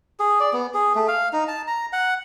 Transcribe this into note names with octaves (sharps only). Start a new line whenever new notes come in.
G#4
D5
B3
G#4
A3
F5
D#4
A5
A#5
F#5